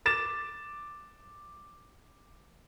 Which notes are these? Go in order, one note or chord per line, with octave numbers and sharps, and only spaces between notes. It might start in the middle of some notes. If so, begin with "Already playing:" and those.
D6 A6 E7